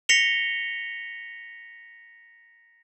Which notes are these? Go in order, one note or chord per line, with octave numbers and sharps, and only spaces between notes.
A#6 B6 C#7 F7 G7